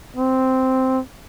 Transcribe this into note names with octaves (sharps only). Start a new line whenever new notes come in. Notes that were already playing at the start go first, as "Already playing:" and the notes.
C4